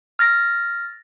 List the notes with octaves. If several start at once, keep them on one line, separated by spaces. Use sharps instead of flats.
F6 A6 A#6